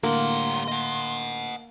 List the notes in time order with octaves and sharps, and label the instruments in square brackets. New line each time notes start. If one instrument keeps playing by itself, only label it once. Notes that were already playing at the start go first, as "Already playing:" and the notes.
[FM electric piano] A2 D3 [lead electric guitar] G3 F#5 [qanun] A#3 [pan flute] C6
[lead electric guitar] D#5 F#5